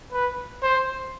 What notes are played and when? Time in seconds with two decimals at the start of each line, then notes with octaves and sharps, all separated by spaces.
0.13 B4
0.63 C5